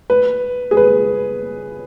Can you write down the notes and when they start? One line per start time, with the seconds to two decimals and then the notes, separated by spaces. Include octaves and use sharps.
0.10 B4
0.71 G#4
0.77 B4